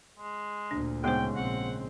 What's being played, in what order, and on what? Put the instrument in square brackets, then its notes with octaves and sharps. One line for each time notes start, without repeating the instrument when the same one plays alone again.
[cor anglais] G#3
[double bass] D2 A#2 [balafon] D4
[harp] G#2 C#3 [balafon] B3 C5 [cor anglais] G5
[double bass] A#1 C4 [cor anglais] F#5